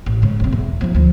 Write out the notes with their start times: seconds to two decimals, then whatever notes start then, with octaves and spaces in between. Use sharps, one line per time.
0.06 A1
0.22 G#2 C#3
0.40 F1 C4
0.52 E2
0.81 F3 D#4
0.95 D2 F3